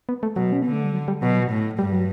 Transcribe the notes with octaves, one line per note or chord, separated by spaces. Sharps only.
B3
A3
B2 F#3
C#4
D3 B3
A3
G3
F#3
G3
B2 F#3
A2
G2 G3
F#3